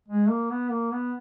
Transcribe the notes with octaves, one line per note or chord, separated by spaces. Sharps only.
G#3
A#3
B3
A#3
B3